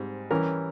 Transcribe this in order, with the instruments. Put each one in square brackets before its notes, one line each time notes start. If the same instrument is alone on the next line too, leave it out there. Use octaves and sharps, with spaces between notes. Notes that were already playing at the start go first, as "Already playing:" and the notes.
Already playing: [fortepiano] G#2 G3 C4
E3 G3 C#4 G4 A#4